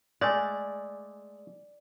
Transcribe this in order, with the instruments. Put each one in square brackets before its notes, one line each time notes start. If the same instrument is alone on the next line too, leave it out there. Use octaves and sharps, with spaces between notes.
[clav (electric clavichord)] G#3 A3 [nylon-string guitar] D5 [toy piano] F5 G#5